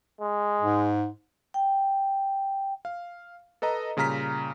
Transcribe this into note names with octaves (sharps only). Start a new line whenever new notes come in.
G#3
G#2
G5
F5
A4 B4 D#5 A#5
A#2 C#3 G3 A#5 F6 B6